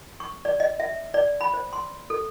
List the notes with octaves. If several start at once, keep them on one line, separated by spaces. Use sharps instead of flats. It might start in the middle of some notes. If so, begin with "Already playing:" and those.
C#6
D5
D#5
E5
D5
B5
C5
C6
A4